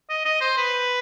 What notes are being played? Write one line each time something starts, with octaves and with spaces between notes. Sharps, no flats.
D#5
D#5
C5
B4